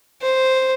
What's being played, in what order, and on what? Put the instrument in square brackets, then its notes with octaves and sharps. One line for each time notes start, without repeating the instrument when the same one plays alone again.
[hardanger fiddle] C5